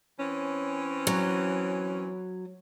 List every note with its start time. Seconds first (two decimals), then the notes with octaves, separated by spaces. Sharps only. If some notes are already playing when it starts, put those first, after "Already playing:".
0.19 E3 C4 C#4
1.07 F#3